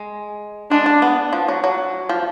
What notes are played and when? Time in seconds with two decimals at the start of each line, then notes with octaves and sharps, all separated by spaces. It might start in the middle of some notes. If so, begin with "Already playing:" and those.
Already playing: G#3
0.71 G#3 D4
0.86 D4
1.02 B3
1.33 F3
1.48 F#3
1.64 F#3
2.09 F3